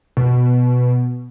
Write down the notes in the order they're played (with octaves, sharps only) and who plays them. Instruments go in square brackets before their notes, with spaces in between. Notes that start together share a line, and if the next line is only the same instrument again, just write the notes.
[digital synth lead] B2